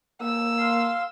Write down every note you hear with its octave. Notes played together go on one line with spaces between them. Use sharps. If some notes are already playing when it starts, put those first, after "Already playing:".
A#3 E6
F5 C6